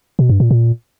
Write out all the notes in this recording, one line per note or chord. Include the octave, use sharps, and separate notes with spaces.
B2
G2
A#2
A#2